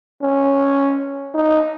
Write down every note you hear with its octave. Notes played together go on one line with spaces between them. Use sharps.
C#4
D#4